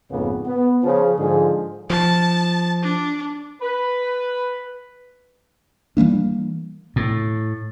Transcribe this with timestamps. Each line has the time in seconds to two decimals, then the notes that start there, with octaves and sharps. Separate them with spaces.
0.10 A#1 F2 G#2 C#3 A#3 B3
0.44 B3
0.83 C#3 F3
1.17 G#2 D3 F3 G#4
1.90 F3 A5
2.83 D4
3.62 B4
5.97 E3 G3 A#3 D4
6.96 A2